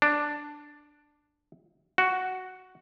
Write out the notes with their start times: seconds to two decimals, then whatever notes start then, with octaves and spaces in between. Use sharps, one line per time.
0.02 D4
1.98 F#4